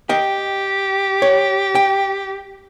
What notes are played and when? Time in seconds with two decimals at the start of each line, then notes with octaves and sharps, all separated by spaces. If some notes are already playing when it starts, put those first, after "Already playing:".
0.09 G4 D#5 G5
1.22 C#5
1.75 G5